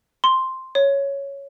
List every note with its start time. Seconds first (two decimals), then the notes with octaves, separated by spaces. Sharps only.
0.24 C6
0.75 C#5